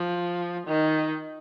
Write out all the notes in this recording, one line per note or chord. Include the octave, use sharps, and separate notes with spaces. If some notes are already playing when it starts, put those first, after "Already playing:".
Already playing: F3
D#3